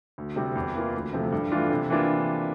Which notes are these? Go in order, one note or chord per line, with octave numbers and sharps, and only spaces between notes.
D2
C3 G3 C4
E2
E3 A#3 F4
D2
C3 F3 A3
G2
E3 A3 D4 F4
C3
E3 A#3 D4 F4